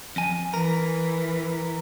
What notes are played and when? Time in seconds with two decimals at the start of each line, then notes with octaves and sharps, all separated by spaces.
0.16 F2 G#5
0.54 E3 A#4